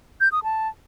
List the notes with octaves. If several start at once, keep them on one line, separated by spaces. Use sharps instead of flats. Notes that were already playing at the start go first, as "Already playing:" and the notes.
G6
D#6
A5